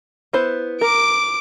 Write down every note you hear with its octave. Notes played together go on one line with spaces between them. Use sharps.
B3 E4 C5
A#4 D6 D7